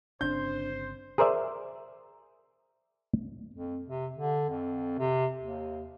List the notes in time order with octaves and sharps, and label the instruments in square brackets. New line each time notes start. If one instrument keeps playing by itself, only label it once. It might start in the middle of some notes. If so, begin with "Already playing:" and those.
[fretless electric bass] G1 C#3 C4 [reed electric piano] D4 [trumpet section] C5 [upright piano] G6
[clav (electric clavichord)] G#4 A#4 C5 D5 E5
[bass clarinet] F2
C3
D3
F2
C3
D#2